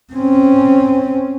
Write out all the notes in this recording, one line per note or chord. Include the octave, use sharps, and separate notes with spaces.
C4 C#4